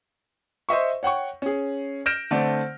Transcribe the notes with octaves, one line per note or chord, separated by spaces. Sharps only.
C5 D#5 E5 C#6
C#5 F#5 G5 C#6
C#4 G#4
F6 G6 A#6 D7 E7
D3 A3 C4 D5